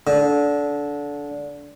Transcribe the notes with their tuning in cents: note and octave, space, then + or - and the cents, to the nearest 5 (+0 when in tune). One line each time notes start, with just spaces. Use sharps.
D3 -20